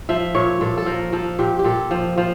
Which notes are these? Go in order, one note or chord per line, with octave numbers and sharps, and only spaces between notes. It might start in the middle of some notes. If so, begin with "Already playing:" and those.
F3 E5
A#2 C#5
A#2 A4
A4
F3 A#4
F3 A4
A#2 G4
G4
A#2 A4
F3
F3